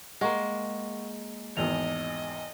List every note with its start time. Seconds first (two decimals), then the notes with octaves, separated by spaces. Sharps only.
0.21 G#3 A#3 F#5 C#6
1.57 G#1 E2 D#5 F7